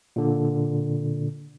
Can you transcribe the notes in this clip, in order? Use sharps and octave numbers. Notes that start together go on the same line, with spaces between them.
A#2 D3